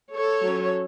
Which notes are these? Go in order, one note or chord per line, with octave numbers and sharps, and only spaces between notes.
A4 C#5
F#3 C#4